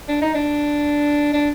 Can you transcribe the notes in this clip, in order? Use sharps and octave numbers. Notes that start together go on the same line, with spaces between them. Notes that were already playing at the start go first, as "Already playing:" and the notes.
D4
D#4
D4
D4